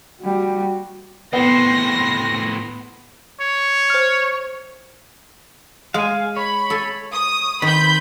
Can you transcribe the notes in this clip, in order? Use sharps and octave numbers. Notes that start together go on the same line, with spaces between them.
G3 F#4
A2 B3 C4 C6 A#6
C#5
C5 F6
G#3 F5 G#5
C#5 B5
A4 G#5
D#6
D#3 C4 B4 B5 G6